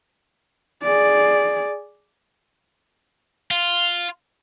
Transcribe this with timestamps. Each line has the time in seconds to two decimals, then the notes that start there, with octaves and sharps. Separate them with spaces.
0.83 G#4 D5
3.51 F4